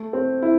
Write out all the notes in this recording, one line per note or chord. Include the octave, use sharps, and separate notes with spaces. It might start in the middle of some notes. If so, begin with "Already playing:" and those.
Already playing: A3
C4
E4